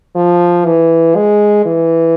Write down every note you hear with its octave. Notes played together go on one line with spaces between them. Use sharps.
F3
E3
G#3
E3